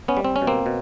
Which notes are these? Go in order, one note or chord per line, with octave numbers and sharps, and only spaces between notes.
B3 C#4
G3
C4
C#4
B2
A#3 C4
B2